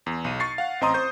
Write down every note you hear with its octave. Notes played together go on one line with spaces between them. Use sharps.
E2
B1 D#7
C#6 A6 C7
F5 F#5
A1 C4 D#5 A#5 C6 D#6
C5 C#6 G6